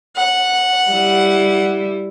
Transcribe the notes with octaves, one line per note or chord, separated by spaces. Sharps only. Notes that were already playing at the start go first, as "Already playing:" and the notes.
F#5
G3 E4